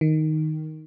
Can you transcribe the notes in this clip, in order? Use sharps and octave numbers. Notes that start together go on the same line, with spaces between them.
D#3